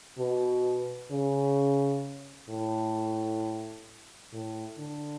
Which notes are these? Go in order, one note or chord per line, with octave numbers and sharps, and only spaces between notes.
B2
C#3
A2
A2
D3